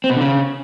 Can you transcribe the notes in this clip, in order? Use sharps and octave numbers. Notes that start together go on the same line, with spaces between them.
C4
B2
D3
C#3